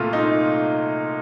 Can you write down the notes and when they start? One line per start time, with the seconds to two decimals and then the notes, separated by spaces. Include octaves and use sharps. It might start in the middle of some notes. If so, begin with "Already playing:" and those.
Already playing: C2 A#2 A3 F4
0.13 D#4